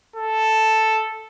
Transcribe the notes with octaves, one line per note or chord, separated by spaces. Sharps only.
A4